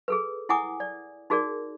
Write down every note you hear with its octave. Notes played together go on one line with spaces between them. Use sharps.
G#4 A4 B4
E4 F#5 G#5 D6 D#6
D5
D#4 F#4 G#4 A#4 D5